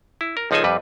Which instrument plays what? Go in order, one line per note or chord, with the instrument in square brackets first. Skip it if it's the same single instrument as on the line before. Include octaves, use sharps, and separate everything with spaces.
[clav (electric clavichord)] E4
A#4
C#2 F3 D#4 G#4 A4 G#5
F2 G3 B4